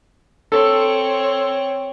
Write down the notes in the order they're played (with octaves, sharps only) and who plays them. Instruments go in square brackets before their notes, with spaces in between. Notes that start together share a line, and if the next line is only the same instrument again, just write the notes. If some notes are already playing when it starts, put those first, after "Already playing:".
[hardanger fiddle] C4 C#5 [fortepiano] A4